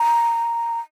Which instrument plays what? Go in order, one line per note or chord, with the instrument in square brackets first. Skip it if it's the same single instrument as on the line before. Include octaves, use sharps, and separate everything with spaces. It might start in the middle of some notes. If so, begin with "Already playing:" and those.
Already playing: [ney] A#5